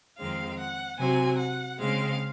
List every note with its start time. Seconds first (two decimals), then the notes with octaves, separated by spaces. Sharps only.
0.18 F2 D#3 G#3 C4 F5
0.58 F#5
0.98 C3 F#3 C4 G#5
1.39 F#5
1.79 C#3 G#3 C4 F5